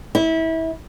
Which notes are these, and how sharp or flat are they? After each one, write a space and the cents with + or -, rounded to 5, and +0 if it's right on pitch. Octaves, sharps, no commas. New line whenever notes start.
E4 -25